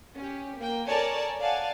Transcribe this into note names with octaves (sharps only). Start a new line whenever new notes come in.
C#4 G4
A#3 G5
A4 A#4 C#5 D5 G#5 A5
D5 F5 F#5 G#5 A5